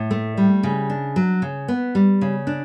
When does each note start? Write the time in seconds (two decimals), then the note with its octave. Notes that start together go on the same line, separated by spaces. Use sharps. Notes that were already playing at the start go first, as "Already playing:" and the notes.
Already playing: A2
0.11 A3
0.37 G3
0.63 C#3
0.90 D4
1.16 F#3
1.42 C#3
1.68 B3
1.95 G3
2.21 C#3
2.47 D4